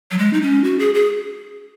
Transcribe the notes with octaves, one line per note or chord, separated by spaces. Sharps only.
F#3
G#3
D#4
C#4
F#4
G#4
G#4